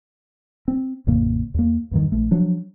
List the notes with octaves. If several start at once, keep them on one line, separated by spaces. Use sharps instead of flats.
C4
A1 F2 C#3 A#3
E2 A#3
E2 G2 D#3
A#1 A3
F3 F#3 D4